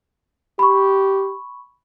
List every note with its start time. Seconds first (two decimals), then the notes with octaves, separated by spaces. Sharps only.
0.59 G4 B5 C#6